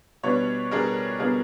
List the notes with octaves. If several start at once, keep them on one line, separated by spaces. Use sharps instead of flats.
B2 G3 B3 D4 B4 C#5
B2 G3 B3 D4 G#4 A#4
B2 G3 B3 D4 G#4 A#4